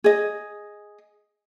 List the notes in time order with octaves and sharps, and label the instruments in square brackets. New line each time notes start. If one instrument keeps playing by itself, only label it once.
[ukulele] G#4 D#5